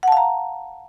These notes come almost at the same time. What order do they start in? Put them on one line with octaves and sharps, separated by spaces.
F#5 A5 F5 A#5